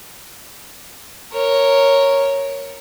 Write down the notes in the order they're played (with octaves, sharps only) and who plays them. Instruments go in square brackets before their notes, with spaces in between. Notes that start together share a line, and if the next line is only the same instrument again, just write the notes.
[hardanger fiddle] A#4 C#5